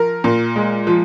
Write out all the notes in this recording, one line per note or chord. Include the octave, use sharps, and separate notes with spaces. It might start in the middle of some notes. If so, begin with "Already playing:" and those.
Already playing: F3 A#4
A#2
G#3
F3